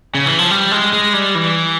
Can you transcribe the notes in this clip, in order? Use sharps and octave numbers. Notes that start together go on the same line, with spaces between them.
C#3
E3
F3
G3
G#3
G#3
G3
E3